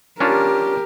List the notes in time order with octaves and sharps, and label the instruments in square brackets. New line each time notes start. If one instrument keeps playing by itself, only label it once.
[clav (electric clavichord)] C#4 D4 F4 [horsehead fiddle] G4 A#4